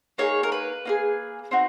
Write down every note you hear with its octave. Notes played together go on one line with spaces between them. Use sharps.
A#3 D#4 G#4 C#5
A#4
B4
A#3 D#4 G#4
C4 D#4 F#4